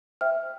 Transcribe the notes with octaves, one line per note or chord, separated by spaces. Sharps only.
C5 E5 G5 F6